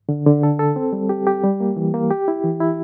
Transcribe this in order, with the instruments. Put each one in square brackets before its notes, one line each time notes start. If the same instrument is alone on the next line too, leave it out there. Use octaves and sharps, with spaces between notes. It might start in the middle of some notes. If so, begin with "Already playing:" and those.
[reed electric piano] D3
D3
A4
A4
C4
G3
G4
G4
G3
A#3
E3
A#3
G4
E4
E3
E4